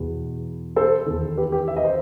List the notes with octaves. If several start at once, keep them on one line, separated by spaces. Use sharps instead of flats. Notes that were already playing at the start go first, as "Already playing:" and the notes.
Already playing: E2 B2
A4 C5
E2 D#3
G4 B4
G4 B4
E5
D#5
C5